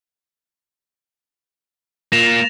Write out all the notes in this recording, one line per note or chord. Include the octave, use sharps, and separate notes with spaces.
A#3 F4 A#6 E7 F7